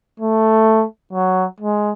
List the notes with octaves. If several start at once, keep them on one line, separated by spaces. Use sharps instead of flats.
A3
F#3
G#3